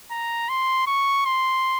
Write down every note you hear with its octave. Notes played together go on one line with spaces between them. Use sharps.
A#5
C6
C#6
C6